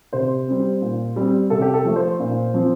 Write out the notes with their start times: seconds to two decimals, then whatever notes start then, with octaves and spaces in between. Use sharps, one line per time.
0.13 C3 C5
0.48 G3 C4
0.82 A#2
1.16 G3 C4
1.50 C3 A4
1.62 G4
1.74 A4
1.85 F3 A3
1.96 C5
2.20 A#2
2.54 F3 C4